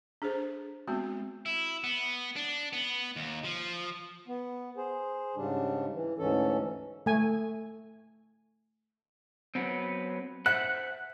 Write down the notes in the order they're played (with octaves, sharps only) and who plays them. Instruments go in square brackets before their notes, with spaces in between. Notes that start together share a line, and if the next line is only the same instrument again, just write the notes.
[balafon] D4 G#4 A4 C5
G#3 B3 C4 F#4
[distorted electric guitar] E4
B3
D4
B3
D#2
F3
[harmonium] B3
G#4 C5
G#2 C#3 G3 D4
E3
D2 G#2 E3 C#4 A4
[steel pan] A3 G#5
[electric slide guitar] F#3 B3 C4
[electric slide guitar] C5 E5 F#5 [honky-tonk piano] F#6